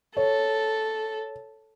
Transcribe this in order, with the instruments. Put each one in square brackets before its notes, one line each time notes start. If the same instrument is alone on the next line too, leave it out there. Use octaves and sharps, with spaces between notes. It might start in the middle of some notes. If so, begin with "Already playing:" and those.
[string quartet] A4 [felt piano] C#5